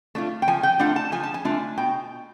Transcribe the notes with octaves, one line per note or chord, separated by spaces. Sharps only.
A3 D4 F4
G5
F3 G#5
G5
A3 D4 F4 F#5
A5
F3 G#5
A5
G#5
A3 D4 F4
B2 G5